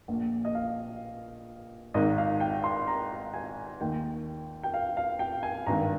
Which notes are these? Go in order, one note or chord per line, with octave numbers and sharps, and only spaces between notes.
A#1 A#2
D#5
F5
G#1 G#2 D#3 D#5
F5
G5
C6
A#5
G#5
D#2 D#3 G5
G5
F5
F5
G5
G#5
G#1 G2 D#3 A#5